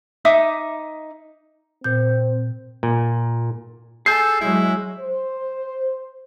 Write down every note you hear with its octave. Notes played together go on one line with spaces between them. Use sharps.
D#4 E5 D6 D#6
A#2 C4 G6
A#2
G#4 A4 G#5 G6 C7
F#3 G#3 E4
C5